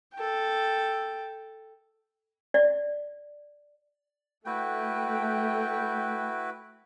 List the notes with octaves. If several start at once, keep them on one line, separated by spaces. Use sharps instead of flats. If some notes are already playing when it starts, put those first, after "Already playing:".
A4 G5
D5
A3 E4 F#4 B4 G5